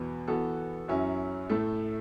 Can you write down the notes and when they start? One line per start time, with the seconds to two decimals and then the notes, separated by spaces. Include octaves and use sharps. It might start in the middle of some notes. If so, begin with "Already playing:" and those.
Already playing: E2 B2 B3
0.28 E3 B3 F#4 A4
0.88 F#2 F#3 C#4 E4
1.49 A2 A3 E4 A4